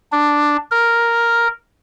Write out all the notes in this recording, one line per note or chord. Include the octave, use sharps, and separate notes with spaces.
D4
A#4